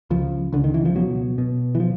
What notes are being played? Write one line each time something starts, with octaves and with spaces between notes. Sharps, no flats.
C#2 F3
C#2 D3
D#3
E3
F3
B2 F#3
B2
E3
F3